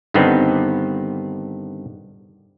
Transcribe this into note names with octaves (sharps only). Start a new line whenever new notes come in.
G2 D3 D#3 B3 C4 D#4